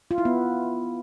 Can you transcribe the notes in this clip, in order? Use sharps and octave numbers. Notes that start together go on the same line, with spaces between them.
F4
E4
B3